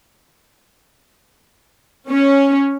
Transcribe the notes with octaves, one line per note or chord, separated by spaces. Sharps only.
C#4